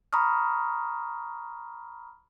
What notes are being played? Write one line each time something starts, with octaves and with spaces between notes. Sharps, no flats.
A#5 B5 C#6 D#6 F6